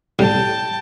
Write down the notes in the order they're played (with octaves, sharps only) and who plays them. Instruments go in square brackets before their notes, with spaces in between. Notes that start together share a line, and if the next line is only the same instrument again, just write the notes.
[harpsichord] B1 A2 G3 [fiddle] G5 A5